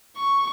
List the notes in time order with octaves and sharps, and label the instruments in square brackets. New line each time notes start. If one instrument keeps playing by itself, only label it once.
[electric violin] C#6